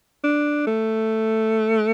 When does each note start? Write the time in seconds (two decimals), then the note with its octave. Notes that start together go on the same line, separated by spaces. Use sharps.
0.24 D4
0.67 A3